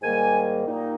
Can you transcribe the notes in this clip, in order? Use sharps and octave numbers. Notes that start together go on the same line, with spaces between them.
G#2 D#3 G3 A#3 G#5
A#2 G3 A#3 D#4